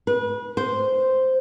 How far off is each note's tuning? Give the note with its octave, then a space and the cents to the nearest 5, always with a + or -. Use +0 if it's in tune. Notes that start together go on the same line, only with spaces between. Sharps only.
B4 -30
C5 -5